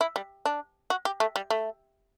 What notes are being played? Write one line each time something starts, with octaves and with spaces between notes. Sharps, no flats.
E4
G3
D4
F#4
G4
A3
G3
A3